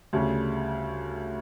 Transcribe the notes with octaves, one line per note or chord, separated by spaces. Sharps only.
D2 C#3 G3